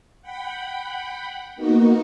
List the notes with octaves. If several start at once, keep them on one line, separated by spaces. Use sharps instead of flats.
F#5 G5 B5
A#3 B3 D#4 F#4